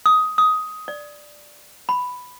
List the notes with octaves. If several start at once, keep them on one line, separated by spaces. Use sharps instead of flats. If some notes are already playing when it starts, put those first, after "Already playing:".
D#6
D#6
D5
B5